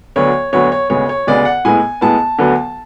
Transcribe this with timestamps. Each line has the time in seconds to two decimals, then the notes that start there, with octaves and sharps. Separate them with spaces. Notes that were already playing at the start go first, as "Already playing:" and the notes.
0.16 D2 D3 F#3 B3 C#5
0.53 D2 D3 F#3 B3 C#5
0.72 C#5
0.90 D2 C#3 G#3 B3 C#5
1.09 C#5
1.27 D2 C#3 G#3 B3 D5
1.45 F#5
1.65 A2 G#3 B3 G#5
2.01 A2 G#3 B3 A5
2.38 D2 D3 F#3 B3